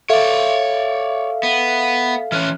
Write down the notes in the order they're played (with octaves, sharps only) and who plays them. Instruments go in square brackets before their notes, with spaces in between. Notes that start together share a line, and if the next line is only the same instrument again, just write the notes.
[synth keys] A4 E5 F5 [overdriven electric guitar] C#5 D5
[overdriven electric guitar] B3
[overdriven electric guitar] E3 C#4 [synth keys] F6 F#6